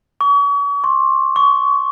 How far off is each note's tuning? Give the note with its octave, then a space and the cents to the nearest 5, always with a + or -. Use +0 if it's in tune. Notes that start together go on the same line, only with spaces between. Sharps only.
C#6 +40
C6 +30
C#6 +30